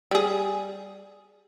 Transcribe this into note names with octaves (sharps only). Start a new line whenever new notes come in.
G3 G#4